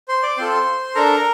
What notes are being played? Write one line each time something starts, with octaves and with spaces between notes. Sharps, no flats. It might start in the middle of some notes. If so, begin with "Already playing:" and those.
C5 C6
D5 D6
C4 F4 A4 C5 C6
D4 A4 A#4 A#5